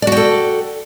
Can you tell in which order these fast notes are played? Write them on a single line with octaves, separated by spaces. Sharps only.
D5 F#4 G5 A4